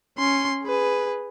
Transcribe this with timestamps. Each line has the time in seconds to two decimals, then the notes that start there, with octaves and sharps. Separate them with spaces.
0.18 C#4 C6
0.64 G#4 B4